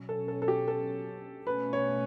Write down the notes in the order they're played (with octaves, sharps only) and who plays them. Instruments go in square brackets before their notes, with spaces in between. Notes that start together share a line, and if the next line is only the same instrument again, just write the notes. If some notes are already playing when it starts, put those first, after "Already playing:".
Already playing: [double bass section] B2 F#3 C#4
[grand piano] A4
A4
A4
G4
A4
[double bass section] B2 A3 C#4 [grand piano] B4
[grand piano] C#5